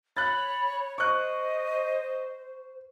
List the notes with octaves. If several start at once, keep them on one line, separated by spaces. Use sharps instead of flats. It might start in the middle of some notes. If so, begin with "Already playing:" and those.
C#5 B5 F#6 A6
C5 D#5 C#6 F#6